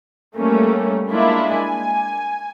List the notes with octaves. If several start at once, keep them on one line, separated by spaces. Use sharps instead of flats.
G3 A3 A#3 C#4
G#3 A#3 D4 E4 F4
G#5